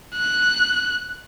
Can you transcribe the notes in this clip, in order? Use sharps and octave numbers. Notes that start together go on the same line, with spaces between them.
F#6